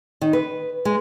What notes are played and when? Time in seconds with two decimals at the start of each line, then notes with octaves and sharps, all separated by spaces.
0.22 D#3
0.33 B4
0.85 G#3